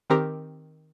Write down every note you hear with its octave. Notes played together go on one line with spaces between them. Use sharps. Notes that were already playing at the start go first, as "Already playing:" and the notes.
D#3 C4 G4 A#4